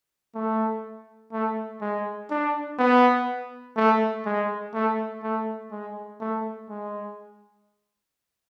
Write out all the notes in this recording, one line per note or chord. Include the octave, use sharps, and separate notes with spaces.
A3
A3
G#3
D4
B3
A3
G#3
A3
A3
G#3
A3
G#3